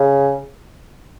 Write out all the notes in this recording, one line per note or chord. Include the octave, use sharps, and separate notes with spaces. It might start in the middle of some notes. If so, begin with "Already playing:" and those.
Already playing: C#3